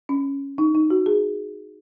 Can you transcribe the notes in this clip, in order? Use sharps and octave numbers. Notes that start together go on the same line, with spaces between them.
C#4
D#4
D#4
F#4
G#4